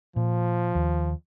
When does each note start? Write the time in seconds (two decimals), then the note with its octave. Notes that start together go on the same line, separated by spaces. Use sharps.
0.16 A#2 F3
0.75 D#2